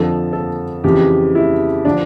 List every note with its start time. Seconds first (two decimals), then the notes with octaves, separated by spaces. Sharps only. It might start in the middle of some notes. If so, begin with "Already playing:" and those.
Already playing: F2 D3 F3 A4
0.33 A4
0.84 F2 C#3 E3 G4
1.35 E4
1.85 D3 F3 D4